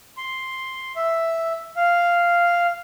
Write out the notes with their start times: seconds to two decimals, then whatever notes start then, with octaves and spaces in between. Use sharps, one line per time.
0.17 C6
0.96 E5
1.76 F5